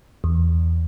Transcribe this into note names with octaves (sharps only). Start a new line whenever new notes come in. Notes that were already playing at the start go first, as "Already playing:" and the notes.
E2